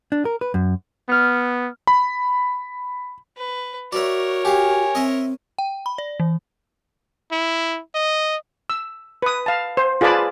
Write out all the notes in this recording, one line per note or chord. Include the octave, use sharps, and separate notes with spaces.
D4
A#4
B4
F#2
B3 F6 C#7
B5
B4
F#4 A#4 C#5 D5 E5
G4 F5 G#5
C4 D#5 E5
G5
B5
D5
E3
E4
D#5
E6
B4 D#6
F5 A5
C5
F4 G#4 B4 D5 A5 B5